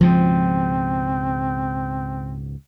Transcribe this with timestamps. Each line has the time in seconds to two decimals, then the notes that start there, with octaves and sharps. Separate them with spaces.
0.01 C#2 G#2 B2 F3 C4